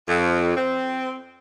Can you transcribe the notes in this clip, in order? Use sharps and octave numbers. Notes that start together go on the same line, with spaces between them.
F2
C4